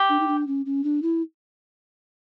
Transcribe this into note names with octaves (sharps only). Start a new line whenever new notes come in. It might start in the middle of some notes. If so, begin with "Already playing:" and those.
Already playing: G4
D4
D#4
D4
C#4
C#4
D4
E4